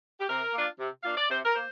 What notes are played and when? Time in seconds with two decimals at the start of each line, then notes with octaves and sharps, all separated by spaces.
0.20 G4
0.29 C3 A#4
0.54 A#3 D4 F4
0.80 C3
1.04 A#3 D4 F4 F5
1.16 D5
1.30 C3 C5
1.45 A#4
1.55 A#3 C5